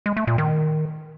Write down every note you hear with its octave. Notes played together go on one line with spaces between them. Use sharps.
G#3
A3
A#2
D#3